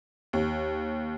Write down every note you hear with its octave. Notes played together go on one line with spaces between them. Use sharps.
D#2